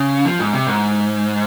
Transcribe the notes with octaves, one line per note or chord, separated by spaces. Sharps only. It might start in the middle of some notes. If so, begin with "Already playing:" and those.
Already playing: C#3
F3
G#2
C3
G#2